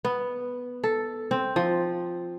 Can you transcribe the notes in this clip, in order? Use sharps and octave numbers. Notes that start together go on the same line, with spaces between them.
B3
A4
C4
F3